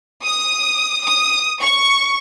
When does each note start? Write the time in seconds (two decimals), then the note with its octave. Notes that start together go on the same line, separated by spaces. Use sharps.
0.24 D#6
1.05 D#6
1.62 C#6